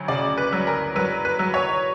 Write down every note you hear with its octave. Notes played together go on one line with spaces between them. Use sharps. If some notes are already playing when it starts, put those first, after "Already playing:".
Already playing: D2 F#3
C#3 D5
B4
F#3
A#4
F#3 B4
B4
F#3
C#5